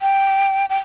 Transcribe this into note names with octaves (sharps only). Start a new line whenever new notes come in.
G5
G5